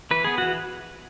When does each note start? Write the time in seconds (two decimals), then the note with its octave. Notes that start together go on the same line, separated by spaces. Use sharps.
0.11 E3 B4
0.24 B3 G#4
0.38 E3 F#4